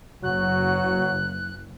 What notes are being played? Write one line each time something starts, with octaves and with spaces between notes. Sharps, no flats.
F#1 F#3 F#4 F#6